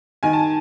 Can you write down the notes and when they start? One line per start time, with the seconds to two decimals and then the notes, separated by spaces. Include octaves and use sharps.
0.23 D#3 G#5
0.33 A5